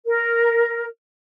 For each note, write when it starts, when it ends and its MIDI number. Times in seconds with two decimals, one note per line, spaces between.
0.06 0.86 70